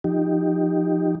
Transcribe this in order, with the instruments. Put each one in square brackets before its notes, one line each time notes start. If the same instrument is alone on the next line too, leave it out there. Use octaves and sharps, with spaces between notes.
[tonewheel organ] F3 D#4 G4